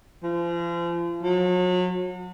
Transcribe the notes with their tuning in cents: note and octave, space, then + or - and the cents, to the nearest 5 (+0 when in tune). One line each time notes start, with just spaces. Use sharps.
F3 -35
F#3 -35